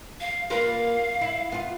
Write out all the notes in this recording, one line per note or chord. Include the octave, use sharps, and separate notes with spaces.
F5
A#3 F4 B4 F5
E4
B3 F4